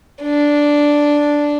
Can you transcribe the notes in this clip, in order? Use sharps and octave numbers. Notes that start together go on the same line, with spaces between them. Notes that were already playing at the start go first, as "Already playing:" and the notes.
D4